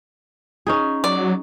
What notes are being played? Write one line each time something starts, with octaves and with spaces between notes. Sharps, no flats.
C#4 D#4 G#4
F#3 D5